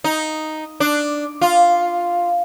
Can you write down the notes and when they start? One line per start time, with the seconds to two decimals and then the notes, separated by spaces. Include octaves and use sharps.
0.04 D#4
0.80 D4
1.41 F4